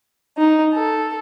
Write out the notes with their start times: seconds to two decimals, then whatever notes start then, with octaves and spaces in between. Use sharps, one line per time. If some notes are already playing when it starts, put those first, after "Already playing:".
0.36 D#4
0.73 A4